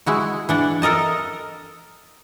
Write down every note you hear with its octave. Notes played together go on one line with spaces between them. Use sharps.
G#3 E4 F#4
E3 D4 F#5
A4 A#4 D#5 A5